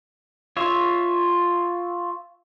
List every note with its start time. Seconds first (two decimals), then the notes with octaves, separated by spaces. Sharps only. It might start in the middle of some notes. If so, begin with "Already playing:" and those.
0.57 F4 C#5 E5